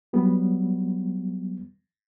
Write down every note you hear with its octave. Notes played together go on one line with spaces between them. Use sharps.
F#3 G3 B3